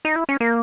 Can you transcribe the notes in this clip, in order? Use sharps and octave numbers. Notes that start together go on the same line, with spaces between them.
D#4
E4
C#4
A#3